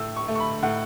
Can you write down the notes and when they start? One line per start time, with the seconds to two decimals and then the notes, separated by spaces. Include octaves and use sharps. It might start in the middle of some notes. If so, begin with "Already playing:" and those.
Already playing: A2 E6
0.16 C#6
0.28 A3
0.35 C#6
0.40 B5
0.62 A2 F#5